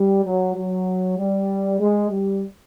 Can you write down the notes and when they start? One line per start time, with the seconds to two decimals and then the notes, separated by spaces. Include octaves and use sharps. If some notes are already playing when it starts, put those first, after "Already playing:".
Already playing: G3
0.25 F#3
0.55 F#3
1.18 G3
1.80 G#3
2.10 G3